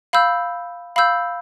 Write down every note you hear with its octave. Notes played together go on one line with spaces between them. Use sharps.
F5 B5 E6 G6
F5 B5 E6 G6